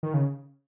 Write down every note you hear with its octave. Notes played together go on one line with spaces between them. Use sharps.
D#3
C#3